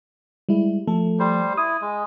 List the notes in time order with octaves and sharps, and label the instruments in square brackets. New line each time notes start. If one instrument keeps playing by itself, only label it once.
[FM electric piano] G3 G#3 E4
F3 A3 A4
[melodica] G3 C5
[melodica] E4 [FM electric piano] D#6
[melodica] G#3